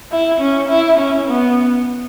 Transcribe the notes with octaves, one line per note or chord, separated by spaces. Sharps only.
E4
C#4
E4
C#4
B3